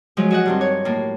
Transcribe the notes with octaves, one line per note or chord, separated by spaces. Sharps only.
F3 F#3 G#3
F#4 D#5 F#5
G2 D#3 C4
C#5
A2 A#3